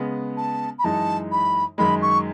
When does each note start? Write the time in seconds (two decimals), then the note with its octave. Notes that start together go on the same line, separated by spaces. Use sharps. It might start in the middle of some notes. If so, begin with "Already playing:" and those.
Already playing: C#3 G#3 B3
0.37 A5
0.78 B5
0.84 F#2 E3 G#3 D#4 A5
1.31 B5
1.78 F#2 D#3 G#3 B5
2.02 C#6